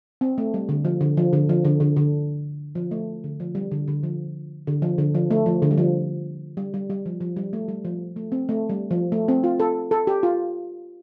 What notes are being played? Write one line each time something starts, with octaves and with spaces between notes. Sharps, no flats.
C4
A3
G3
D3
F3
D3
F3
D3
F3
D3
D3
D3
F3
A3
D3
F3
G3
D3
D3
F3
D3
F3
D3
F3
A3
F3
D3
G3
F3
G3
G3
G3
F3
F3
G3
A3
G3
F3
A3
C4
A3
G3
F3
A3
C4
F4
A4
A4
G4
F4